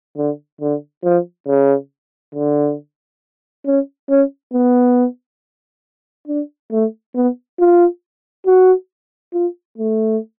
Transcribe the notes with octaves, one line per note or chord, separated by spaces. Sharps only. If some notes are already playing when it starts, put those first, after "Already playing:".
D3
D3
F3
C#3
D3
C#4
C#4
B3
D4
A3
B3
F4
F#4
F4
A3